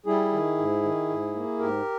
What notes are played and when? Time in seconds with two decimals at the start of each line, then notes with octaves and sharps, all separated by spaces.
0.06 G3 E4 G#4
0.33 D#3
0.58 G#2
0.83 D#3
1.09 G#2
1.35 A#3
1.59 G#2 G4 A#4